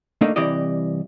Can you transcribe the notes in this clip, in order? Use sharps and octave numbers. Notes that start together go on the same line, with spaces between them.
A3 A#3 D4 D#4
C2 C3 E3 G4 D5 D#5